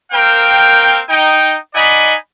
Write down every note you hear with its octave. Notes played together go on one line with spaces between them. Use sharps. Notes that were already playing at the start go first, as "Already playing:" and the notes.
A#3 C4 A#4 F5 G5
D#4 G5
D#4 D5 D#5 F#5 G#5 B5